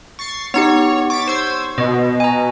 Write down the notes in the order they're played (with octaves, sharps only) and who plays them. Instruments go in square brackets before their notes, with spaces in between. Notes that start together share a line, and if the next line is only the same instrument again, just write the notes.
[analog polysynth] C#6 A6 C7
[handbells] B3 D#4 G4 [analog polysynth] C#5
[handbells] C#6 [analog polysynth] D6 A6 B6
[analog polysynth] C5 E6 G#6
[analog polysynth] B2 [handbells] D#5
[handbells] G#5 A#5